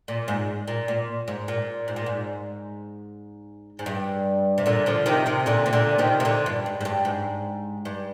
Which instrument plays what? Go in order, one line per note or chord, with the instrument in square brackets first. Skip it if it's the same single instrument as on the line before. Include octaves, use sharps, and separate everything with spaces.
[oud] A#2
G#2
A#2
A#2
G#2
A#2
G#2
A#2
G#2
G#2
G2
C3
A#2 D3
D3 F3
C3 D#3
C3 D#3
A#2 D3
C3
A#2 D3
C3 D#3
C3
A#2 D3
G2
G#2
G#2
G2
G#2
G2